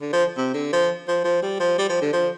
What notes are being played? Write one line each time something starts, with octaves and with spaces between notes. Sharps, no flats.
D3
F3
C3
D3
F3
F3
F3
G3
F3
G3
F3
D3
F3